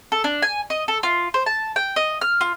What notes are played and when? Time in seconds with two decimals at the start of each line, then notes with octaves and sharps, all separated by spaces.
0.12 A4
0.24 D4
0.42 G#5
0.70 D#5
0.88 A4
1.03 F4
1.34 C5
1.46 A5
1.76 G5
1.96 D#5
2.21 F6
2.41 F4